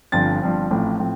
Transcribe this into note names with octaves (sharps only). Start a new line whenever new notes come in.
G1 G2 F3 C4 A6
G1 G2 F3 C4
A1 A2 F3 C4
A2 F3 C4